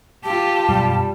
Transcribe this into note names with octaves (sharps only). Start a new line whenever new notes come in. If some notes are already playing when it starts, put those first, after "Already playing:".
F4 G4 A5
F#2 B2 G3